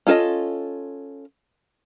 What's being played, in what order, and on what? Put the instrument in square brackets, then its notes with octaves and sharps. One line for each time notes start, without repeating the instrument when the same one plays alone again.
[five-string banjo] C#4 F4 A4 C#5 D#5